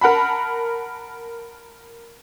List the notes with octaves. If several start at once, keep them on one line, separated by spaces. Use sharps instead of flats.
A#4 F#5 A5 B5